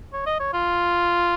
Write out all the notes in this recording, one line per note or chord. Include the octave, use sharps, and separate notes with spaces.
C#5
D#5
C#5
F4